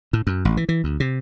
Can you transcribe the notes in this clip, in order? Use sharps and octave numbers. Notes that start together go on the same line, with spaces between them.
A2
F#2
A1
E3
E3
D2
C3